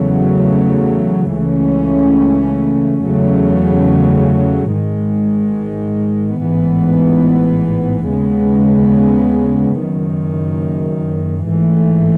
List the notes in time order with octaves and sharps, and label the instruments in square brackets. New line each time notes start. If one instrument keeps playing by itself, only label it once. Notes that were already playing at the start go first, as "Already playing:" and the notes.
Already playing: [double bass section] E2 C#3 F#3 A3
C#2 C#3 E3 A3 C#4
E2 C#3 F#3 A3
G#1 G#2 D#3 G#3
A1 G#2 E3 B3
D#2 C#3 G#3 B3
F#1 F#2 D#3
A1 G#2 E3 A3